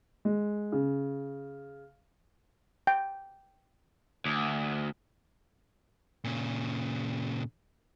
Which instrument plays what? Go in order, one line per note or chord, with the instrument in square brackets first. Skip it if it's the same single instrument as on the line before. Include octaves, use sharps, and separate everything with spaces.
[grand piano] G#3
C#3
[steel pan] G5
[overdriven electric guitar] D2
[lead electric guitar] A#2 C#3